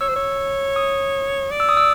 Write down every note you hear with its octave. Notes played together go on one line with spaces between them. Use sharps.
C#5 E6
C5
C#5
D#6
D5
E6
D#6
E6